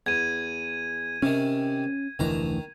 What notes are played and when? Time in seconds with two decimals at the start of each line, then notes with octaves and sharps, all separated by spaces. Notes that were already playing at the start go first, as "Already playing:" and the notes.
0.06 E2 G#6 D#7
1.23 C3 D#3 C#4
2.19 F1 D2 D#3 E3 A#5